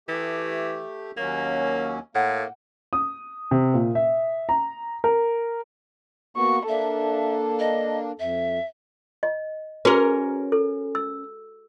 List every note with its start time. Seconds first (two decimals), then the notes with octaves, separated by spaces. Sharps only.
0.09 E3 A3 G4 E5 D#6
1.17 D#2 F#3 A#3 C#4 E6
2.15 A2 A#3 F#5 G5
2.93 D#6
3.51 C3
3.74 A#2
3.95 E5
4.49 A#5
5.04 A#4
6.37 A#3 B3 F#4 C#6
6.68 A#3 D4 A4 E5
7.60 D#5
8.19 F2 E5
9.23 D#5
9.85 C#4 F#4 G#4 A#4 B4
10.52 A4
10.95 E6